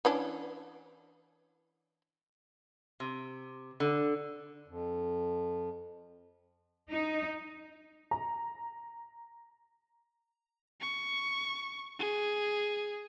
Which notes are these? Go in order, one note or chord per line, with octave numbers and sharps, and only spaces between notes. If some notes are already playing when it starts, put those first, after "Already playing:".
E3 C#4 D4
C3
D3
F2
D#4
A#5
C#6
G#4